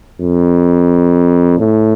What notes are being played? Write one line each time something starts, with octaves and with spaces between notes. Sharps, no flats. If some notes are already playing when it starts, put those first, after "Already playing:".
F2
A2